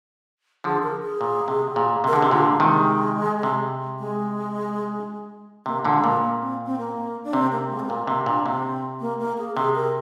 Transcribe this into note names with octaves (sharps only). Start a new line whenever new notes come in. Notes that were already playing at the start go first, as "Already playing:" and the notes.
D3 F3 G#4
A#4
G#4
A#2
C3
A#2
C3 A#4
D3 G#4
C3 G4
A#2 D3 F4
G#3
C3 D#3
G#3
C3
G#3
C3 A#3
A#2 D3 G#3
G#3
A#2 A#3
A#3
C4
C4
A#3
D4
C3 C4
A#3
G#3
C4
A#2 A#3
C3 A#3
A#2 D4
C3 C4
A#3
A#3
G#4
C3 G#4
A#4